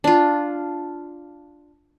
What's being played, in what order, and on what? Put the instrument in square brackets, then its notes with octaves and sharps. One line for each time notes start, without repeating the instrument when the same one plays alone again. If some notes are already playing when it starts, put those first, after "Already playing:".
[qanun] D4 F4